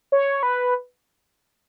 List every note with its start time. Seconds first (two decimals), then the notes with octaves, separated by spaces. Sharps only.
0.12 C#5
0.43 B4